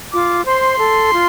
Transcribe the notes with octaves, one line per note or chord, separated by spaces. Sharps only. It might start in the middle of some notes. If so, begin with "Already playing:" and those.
F4 D6
C5 C6
A4
F4